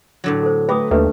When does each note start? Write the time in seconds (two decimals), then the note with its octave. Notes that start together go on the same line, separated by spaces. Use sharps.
0.24 A2 D3 F#3
0.43 A4 C5
0.69 A3 B4 G5 A#5 D6 D#6
0.91 D#2 A3 D4 B4 E5